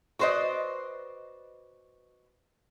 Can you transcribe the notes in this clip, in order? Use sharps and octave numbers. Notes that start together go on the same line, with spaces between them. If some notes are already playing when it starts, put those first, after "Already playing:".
F#4 B4 C5 D5 D#5